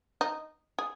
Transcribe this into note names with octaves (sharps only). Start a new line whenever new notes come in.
D#4
G#4